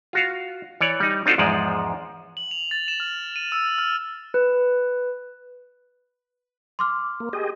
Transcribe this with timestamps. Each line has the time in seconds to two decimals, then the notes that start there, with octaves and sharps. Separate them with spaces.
0.13 F4 F#4 F5
0.81 E3 C#5 D5
1.00 G3 D#4
1.26 C4 D4 D#4 F4 F#4 A4
1.38 E2 G#2 F3 G#3 D5
2.37 F#7
2.51 F7
2.71 A6
2.88 E7
3.00 F6
3.36 D#7
3.52 E6
3.78 F6
4.34 B4
6.79 C6 D6 F6
7.20 A#3
7.33 G4 G#4 D#5